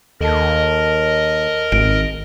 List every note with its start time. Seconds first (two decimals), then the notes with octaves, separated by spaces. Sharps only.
0.20 D#2 A4 A#4 D#5 A5
1.72 G#1 D7